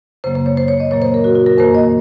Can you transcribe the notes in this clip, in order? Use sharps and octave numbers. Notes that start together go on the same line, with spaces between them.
F#2 C#3 F#3 A#3 C5
C5
C#5
C5
C#5
D#5
A#2 F#3 A#3 C#5
C5
A#4
F#4
F#4
A#4
F2 D#3 A#3 C5
D#5